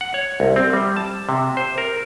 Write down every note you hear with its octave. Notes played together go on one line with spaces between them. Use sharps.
F#5
C#5
C2
C4
G3
A5
C3
C5
A#4